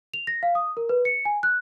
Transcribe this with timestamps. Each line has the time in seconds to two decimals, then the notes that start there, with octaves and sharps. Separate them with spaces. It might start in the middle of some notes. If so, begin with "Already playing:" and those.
0.14 F7
0.27 A#6
0.43 F5
0.55 D#6
0.77 A#4
0.89 B4
1.05 C#7
1.25 G#5
1.43 F#6